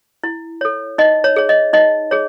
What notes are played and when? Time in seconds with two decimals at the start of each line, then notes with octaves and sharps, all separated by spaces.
0.24 E4
0.61 A4 C#5
0.98 D#4 D#5
1.24 C#5
1.36 G#4 C#5
1.49 D#5
1.73 D#4 D#5
2.11 G#4 C#5